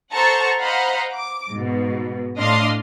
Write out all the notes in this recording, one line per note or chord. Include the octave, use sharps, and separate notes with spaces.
A4 C5 F#5 A5 A#5 C#6
C5 D#5 F5 F#5 A#5 B5
D6
G#2 B2
A2 D4 D#5 F5 C6